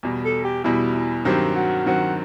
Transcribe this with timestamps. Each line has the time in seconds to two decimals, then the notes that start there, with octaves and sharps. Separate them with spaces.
0.03 E2 B2 G3
0.25 A4
0.44 G4
0.64 E2 B2 G3 E4
0.95 E4
1.25 G2 D#3 F#3 C4 G4
1.55 F#4
1.86 G2 D#3 F#3 C4 F#4